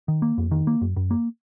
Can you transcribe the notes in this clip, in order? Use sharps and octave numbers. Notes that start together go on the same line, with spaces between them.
D#3
A#3
F2
D#3
A#3
F#2
F#2
A#3